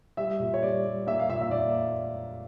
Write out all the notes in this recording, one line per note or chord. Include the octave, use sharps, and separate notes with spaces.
G3 E5
A#2
C#5
G3 D5
G3
A#3 E5
F5
A#2 E5
E5
A#3 D5